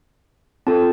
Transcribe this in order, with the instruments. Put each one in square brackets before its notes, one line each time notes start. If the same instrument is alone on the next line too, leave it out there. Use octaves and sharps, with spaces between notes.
[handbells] C4 F4 A4 A5